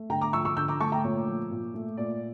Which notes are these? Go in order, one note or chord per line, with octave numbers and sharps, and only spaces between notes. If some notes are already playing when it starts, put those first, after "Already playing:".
Already playing: A3
D3 G5 A#5
A#5 D6
F3 C#6 E6
C#6 E6
D3 E6 G6
A#5 D6
A3 A5 C#6
G5 A#5
A#2 C#5
F3
A#2
A3
A#2 D5